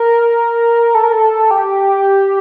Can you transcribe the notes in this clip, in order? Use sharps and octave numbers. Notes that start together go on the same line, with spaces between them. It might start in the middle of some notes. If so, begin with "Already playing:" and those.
Already playing: A#4
A4
A#4
A4
G4